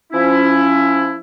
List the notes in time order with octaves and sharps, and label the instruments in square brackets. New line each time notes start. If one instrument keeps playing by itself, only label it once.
[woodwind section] F3 C#4 E4